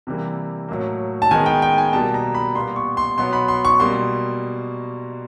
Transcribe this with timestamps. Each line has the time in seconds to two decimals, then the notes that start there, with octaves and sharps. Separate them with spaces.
0.07 C3 E3 G3 A#3
0.68 A2 F#3 A#3
1.22 A5
1.31 D#3 G#3 B3 G#5
1.46 G5
1.62 G5
1.78 G#5
1.93 B2 G3 A#3 A5
2.14 A#5
2.35 B5
2.55 A#2 G3 B3 C6
2.76 C#6
2.97 C6
3.18 B2 F#3 B3 C6
3.33 B5
3.48 C6
3.65 C#6
3.80 B2 G3 A#3 C6